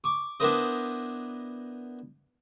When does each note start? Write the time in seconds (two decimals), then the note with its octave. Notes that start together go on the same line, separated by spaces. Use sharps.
0.04 C#6 D6
0.40 B3 D4 E4 A#4 C5 D#5